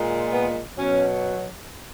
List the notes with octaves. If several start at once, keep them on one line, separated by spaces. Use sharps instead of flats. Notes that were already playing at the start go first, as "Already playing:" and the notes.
Already playing: A#2 G#3
B3
B2 F#3 C#4